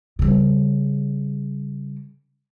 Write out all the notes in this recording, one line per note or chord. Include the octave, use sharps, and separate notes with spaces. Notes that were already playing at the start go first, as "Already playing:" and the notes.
C#3 G3